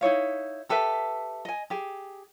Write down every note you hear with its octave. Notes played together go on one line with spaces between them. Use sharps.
D#4 E4 C#5 F5
G4 A4 B4 E5
D#5 G#5
G4 G#4